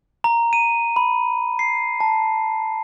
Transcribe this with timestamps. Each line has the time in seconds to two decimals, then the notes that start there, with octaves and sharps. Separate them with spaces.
0.24 A#5
0.53 D#7
0.96 B5
1.59 C7
2.00 A5